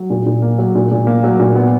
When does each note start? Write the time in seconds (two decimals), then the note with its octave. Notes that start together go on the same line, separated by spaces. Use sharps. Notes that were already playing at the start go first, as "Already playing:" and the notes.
Already playing: F#3
0.10 A#2
0.26 A#2
0.42 A#3
0.58 F#3
0.75 A#2
0.91 A#2
1.07 A#3
1.23 F#3
1.39 A#2
1.56 B3